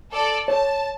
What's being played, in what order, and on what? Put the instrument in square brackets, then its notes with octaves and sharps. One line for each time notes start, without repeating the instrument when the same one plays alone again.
[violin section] A4 D5
[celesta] C#5 [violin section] A5